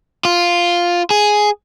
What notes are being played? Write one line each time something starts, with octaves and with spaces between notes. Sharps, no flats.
F4
G#4